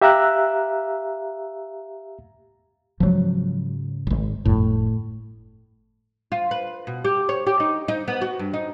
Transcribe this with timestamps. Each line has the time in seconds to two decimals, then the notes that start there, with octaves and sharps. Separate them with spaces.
0.02 G4 E5 F5 A#5 E6 F#6
3.00 G#2 C#3 F3 F#3
4.07 D#1 G#1
4.45 G1 F2 A2
6.32 F4
6.51 B4
6.87 B2
7.05 G4
7.29 C#5
7.47 G4
7.60 D#4
7.88 D#4
8.08 B3
8.22 F#4
8.39 G2
8.53 D#4